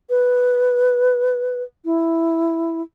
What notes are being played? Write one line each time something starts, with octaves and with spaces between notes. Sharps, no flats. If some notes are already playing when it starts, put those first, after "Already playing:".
B4
E4